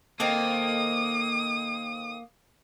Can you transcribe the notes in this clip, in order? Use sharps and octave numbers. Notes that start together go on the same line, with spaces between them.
D#3 A#3 C4 A4 D#6